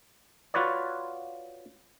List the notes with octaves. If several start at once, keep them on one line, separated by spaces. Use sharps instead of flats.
F4 F#4 B4 C#5 D5